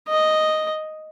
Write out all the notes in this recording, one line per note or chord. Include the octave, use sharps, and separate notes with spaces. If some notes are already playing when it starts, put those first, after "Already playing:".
D#5